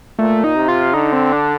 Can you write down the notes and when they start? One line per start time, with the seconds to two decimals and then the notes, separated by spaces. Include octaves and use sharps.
0.19 A#2 A3
0.44 D#4
0.56 C3
0.68 F4
0.94 D3 D#4
1.13 C4
1.33 D4